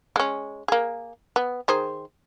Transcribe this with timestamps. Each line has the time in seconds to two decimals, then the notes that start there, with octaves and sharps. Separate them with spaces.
0.16 G#3 C#4
0.68 A#3 G#4
1.36 B3
1.68 D#3 G#4 C5